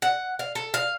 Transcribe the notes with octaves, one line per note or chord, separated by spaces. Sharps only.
F#5
F5
A4
F5